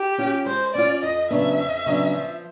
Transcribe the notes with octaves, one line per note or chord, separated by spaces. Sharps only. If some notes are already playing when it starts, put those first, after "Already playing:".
Already playing: G4
C#4 F4
G#3 C5
C#4 F4 D5
F2 D#5
C#3 F#3 B3 D4 E5
F2
C#3 F#3 B3 D4
F3